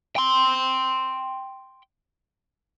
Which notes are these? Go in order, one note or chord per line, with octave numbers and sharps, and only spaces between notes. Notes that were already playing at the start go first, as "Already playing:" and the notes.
G5 C6